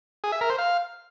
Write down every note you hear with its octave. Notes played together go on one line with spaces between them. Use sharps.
G#4
E5
A#4
C5
F5